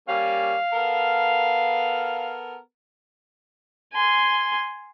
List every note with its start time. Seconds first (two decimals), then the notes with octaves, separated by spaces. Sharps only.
0.08 G3 A#3 C#4 F5
0.73 B3 A4 A#4
3.93 G#5 C6